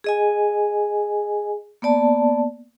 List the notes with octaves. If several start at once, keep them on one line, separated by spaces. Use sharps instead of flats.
G#4 D#5 G#5
A#3 B3 D5 A5